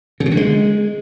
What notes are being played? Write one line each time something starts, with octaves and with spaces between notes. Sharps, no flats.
C#3
C3
D3
G#3